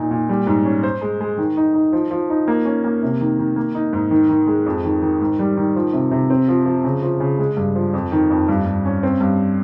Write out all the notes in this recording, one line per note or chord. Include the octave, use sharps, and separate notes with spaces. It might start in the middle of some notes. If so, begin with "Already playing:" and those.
Already playing: A#2 D#4
A#2
G3
G#2
C#4
C5
G#3
G#3
D#3
D#4
D#4
F3
F3
D#4
A#3
C#4
A#3
C3
D#3
D#3
A#3
D#4
G#2
D#3
D#3
G#3
F2
D#3
D#3
G#2
G3
D#3
F3
C3
C3
C4
F3
F3
C#3
F3
C#3
G#3
G2
F3
F2
D#3
F2
G2
G2
C#4
C4
G2